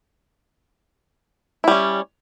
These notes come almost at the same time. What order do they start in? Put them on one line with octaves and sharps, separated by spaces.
E4 G3 C#4